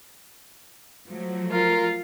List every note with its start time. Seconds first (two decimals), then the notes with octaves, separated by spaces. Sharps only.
1.09 F3 F#3 A3
1.52 F4 A#4